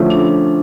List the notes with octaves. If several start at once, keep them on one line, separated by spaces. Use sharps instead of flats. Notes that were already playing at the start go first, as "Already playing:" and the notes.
Already playing: D3 F3 A3 C#4 F4
D4